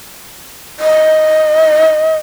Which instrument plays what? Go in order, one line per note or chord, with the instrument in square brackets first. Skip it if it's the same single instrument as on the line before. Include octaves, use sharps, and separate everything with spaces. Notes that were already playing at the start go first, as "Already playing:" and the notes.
[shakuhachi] D#5